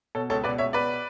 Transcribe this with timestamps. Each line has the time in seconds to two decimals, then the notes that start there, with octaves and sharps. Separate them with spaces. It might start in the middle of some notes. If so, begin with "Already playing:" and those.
0.15 B2 A4 C#5
0.30 C#2 A4 C#5
0.44 B2 B4 D5
0.58 C#2 C#5 E5
0.73 B2 B4 D5